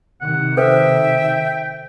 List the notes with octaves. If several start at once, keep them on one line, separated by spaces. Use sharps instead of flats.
C3 D#3 F#5
A4 B4 C5 E5 G5